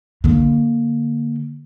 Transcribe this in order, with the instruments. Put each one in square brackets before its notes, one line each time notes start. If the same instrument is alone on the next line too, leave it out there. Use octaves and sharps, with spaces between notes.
[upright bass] D3 A#3